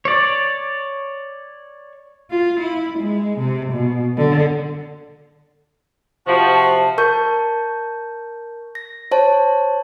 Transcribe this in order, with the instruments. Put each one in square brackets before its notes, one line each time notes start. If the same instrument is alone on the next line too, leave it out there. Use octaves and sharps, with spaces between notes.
[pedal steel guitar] C#5 D5
[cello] F4
E4
G#3
C3
B2
D3
[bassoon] C3 [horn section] F3 [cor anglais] F#4 [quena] A5
[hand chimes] A#4 A5 C#6 G6
A#6
C5 C#5 A5